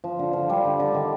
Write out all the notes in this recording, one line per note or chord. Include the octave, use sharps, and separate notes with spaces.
F3
D3
F3
G3
D3
D3
D#3